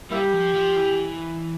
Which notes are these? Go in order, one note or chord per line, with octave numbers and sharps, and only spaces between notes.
G3 A#3 E4 G4
F3
F3
E3